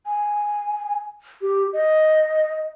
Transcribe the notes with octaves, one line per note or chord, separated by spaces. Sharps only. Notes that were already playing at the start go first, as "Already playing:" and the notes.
G#5
G4
D#5